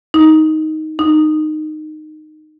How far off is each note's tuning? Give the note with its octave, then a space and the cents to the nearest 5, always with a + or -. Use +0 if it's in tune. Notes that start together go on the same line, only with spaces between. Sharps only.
D#4 +10
D#4 -15